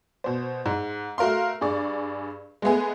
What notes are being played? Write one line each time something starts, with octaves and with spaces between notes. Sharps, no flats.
B2 C5
G#2
A3 F#4 A#4 F5 C6
G2 G#4 D5 C#6
G#3 A3 B3 G#4